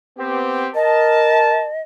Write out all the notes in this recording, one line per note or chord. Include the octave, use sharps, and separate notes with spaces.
B3 C4 G4
A#4 D#5 A5